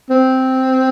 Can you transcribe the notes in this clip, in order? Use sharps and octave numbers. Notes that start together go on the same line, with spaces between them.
C4